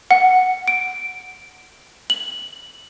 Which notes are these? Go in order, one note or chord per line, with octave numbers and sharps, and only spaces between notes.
F#5
D7
F#7